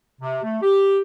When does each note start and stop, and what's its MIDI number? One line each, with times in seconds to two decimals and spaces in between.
0.21 0.41 48
0.43 0.58 57
0.62 1.01 67